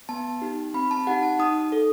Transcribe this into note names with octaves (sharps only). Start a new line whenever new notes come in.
B3 A5
D#4 G4
C4 B5
A5
D#4 G4 F#5
A5
D#4 D#6
A4